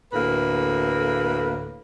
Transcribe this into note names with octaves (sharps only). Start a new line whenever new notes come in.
D2 A2 A#3 B4